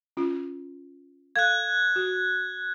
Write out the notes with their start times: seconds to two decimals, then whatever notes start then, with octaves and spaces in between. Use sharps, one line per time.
0.17 C#4 F4
1.36 A4 F5 F#6 G#6
1.96 F#4